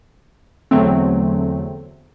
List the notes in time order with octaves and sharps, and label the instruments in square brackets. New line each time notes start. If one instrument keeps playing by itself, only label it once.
[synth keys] E2 D3 F#3 A3 C4